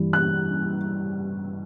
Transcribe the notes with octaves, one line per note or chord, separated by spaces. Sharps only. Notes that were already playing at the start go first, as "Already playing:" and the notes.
Already playing: G2 E3 G3
F#6